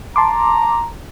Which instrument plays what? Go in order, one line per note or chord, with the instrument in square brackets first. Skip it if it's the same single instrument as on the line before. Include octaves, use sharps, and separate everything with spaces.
[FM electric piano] A5 C6 D6 [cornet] A#5